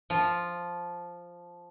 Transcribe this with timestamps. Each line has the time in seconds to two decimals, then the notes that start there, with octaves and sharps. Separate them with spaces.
0.10 F3